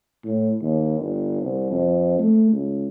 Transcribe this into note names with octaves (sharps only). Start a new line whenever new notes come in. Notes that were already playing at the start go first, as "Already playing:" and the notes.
A2
D#2
G1
C2
F2
A3
C#2